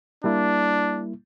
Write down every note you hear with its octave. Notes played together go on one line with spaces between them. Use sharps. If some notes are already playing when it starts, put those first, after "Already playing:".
G3 A#3 D4 E4